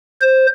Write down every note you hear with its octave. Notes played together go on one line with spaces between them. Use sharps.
C5